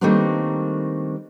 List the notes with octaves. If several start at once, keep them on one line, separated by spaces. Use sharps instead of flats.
D#3 G3 A3 A#3 C4 D4